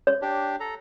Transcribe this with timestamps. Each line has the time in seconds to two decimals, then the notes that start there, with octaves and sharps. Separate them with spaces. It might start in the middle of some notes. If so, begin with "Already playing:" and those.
0.07 C#5
0.22 D4 G4
0.60 A4 A#5